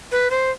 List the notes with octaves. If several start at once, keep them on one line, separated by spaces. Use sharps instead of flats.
B4
C5